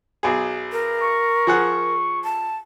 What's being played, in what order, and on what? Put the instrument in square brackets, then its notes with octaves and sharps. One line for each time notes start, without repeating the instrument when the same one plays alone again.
[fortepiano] B1 G#4
[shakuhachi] A#4
[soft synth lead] C#6
[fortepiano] F3 G#4 F#5
[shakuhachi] A5